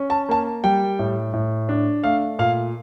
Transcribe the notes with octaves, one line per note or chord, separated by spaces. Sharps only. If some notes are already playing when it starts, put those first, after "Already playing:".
Already playing: C#4
A5
A#3 A5
G3 G5
A2
A2
D4
A3 F5
A#2 F5